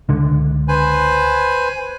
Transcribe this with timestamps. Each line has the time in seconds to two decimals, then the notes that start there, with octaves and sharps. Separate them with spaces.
0.09 C#2 D3
0.68 B4 C5 G#5